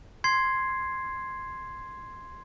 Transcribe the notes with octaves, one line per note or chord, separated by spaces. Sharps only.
C6 G#6 C7